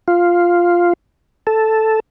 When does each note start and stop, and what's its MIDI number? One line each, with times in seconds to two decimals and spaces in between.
0.08 0.93 65
1.47 2.00 69